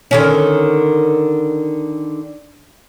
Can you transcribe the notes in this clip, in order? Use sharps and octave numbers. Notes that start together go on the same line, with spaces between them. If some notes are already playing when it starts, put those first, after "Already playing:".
D3 D#3 C#4